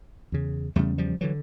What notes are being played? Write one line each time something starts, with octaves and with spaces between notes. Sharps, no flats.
E2 C#3
E2 C#3 G3 A3
F3 G3
D3 E3 F#3